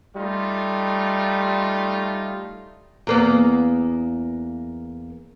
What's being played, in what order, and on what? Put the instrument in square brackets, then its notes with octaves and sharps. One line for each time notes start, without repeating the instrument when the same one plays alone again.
[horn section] G3 A3 D#4 F4
[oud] E2 A#3 B3